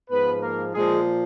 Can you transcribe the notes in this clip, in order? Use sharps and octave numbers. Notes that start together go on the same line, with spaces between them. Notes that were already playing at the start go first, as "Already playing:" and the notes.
G#2 F3 B3 B4
A#3 A#4
A#2 F3 G#3 G#4